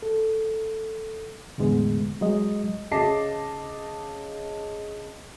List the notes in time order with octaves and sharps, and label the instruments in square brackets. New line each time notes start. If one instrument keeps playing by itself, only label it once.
[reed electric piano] A4
E2 A2 D3 G#3 B3
F#3 G#3 D#5
[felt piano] C#3 D#5 A5 D6 A#6 C7